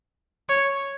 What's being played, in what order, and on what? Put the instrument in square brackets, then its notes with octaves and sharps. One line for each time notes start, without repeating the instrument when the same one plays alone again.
[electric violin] C#5